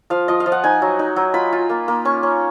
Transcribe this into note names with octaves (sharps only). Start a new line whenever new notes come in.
F3 F5
F3 D#5
F5
F3
F#5
D#4 G#5
F#3
D#4
F#3
F4 B5
F4
A#3
A#3
C#4 C#6
C#4